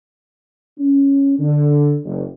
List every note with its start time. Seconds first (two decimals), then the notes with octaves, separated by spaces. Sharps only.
0.79 C#4
1.39 D3
2.04 F#1